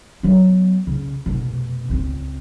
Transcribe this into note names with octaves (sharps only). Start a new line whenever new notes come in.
F#3 B3
C#3 C#4
F1 B2
C#2 C4